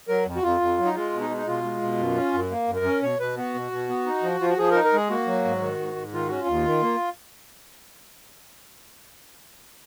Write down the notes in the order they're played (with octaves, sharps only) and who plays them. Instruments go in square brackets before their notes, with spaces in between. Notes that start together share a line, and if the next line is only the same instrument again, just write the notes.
[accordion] F#3 A#4
F2
F#4
F2 F4
F2
F#3
D#4
G#3 F4
B2
D#4
G#3
D#4
B2 F4
G#3
B2
F#2
C#4
F#2
A#3
F#2
A#4
C#4
B2 C#5
B2 B4
B3 F#4
B2
B2
B3
D#4
F3
F3 F4
F#4
F3 G#4
D#4 A#4
A#4
G#3 G#4
A#3 F#4
F#3
G#2
D#3
G#2
G#2
D#3 F4
C#4 F#4
F4
D#2
D#3
A#3